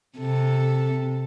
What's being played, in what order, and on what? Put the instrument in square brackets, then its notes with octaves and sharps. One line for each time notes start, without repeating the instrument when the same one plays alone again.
[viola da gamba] C3 A4